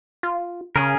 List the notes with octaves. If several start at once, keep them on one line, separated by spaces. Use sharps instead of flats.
F4
C#3 C#4 G#4 A#4